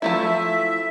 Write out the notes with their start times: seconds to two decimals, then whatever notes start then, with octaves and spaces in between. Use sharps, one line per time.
0.02 F3 A3 E4 E5